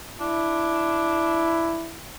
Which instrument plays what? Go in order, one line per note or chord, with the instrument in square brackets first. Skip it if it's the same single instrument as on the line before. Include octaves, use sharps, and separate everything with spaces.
[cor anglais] D4 [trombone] E4